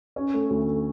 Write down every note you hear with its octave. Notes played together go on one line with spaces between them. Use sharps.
C#4
A3
D2
A3